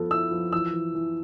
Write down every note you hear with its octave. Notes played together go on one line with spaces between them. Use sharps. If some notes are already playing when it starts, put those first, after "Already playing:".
Already playing: F3 B3 A4
E4 E6
F3
E3 E6
E3
E3